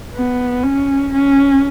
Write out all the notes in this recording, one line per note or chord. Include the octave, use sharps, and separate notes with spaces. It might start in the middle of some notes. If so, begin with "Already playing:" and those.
B3
C#4
C#4